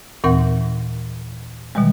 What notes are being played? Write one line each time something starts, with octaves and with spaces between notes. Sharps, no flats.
D#2 A#2 E3 C4 A#4 F#5
B2 D#3 E3 G3 G#3